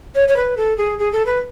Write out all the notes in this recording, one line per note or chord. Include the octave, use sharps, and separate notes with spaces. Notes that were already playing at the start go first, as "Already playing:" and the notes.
C#5
C#5
B4
A4
G#4
G#4
A4
B4